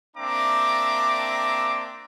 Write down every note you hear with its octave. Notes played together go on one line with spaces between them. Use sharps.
A#3 C4 D4 E5 A#5 D6